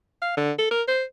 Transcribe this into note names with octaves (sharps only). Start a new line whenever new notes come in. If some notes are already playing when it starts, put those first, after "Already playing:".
F5
D3
A4
A#4
C5